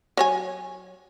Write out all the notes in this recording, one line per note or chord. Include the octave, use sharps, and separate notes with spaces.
F#3 C#5 G#5